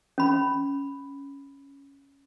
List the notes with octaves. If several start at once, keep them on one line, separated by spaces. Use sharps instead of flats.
C#4 B5